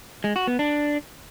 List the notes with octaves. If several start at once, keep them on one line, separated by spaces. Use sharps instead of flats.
G#3
F#4
B3
D4